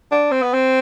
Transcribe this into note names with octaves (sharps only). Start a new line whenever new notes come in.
D4
C4
B3
C4